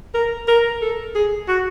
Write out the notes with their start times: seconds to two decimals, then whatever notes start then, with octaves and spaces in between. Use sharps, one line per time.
0.15 A#4
0.48 A#4
0.81 A4
1.15 G#4
1.48 F#4